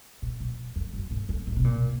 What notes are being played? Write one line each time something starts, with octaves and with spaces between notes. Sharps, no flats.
A#2
A#2
F2
F#2
G#2
F2
G#2
C3
A#2